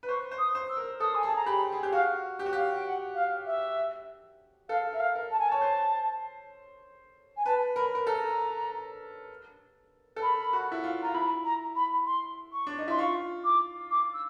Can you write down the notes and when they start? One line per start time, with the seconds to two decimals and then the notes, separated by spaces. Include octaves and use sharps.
0.03 B4
0.09 C5 C#6
0.31 C5
0.38 D#6
0.55 C5
0.70 E6
0.77 A#4
1.00 A4 D#6
1.15 G#5
1.23 G#4 A5
1.36 A#5
1.46 G4 B5
1.72 G#4
1.83 G4
1.92 F#4 F5
2.39 G4
2.46 F#4
2.53 G4 F5
2.74 G5
2.85 F#5
3.15 F5
3.46 E5
4.69 A4 F5
4.93 A#4 E5
5.00 F5
5.15 A#4
5.31 A5
5.39 G#5
5.49 C#5 A5
5.61 C5
7.37 G#5
7.45 B4 A5
7.76 A#4 B5
7.95 A#4
8.07 A4 A#5
10.16 A4
10.22 A#4 B5
10.53 F#4
10.72 E4
10.84 F4
11.03 F4 A#5
11.14 E4 B5
11.45 A#5
11.76 B5
12.06 C6
12.52 C#6
12.67 D4
12.78 D#4
12.88 E4 C6
12.99 F4 C#6
13.44 D6
13.90 D6
14.14 E6